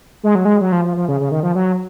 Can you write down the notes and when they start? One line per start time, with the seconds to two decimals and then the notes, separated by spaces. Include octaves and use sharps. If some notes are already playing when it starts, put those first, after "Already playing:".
0.23 G#3
0.35 F#3
0.45 G#3
0.61 F#3
0.72 F3
0.85 F3
0.97 F3
1.08 C#3
1.20 C#3
1.32 D#3
1.43 F3
1.55 F#3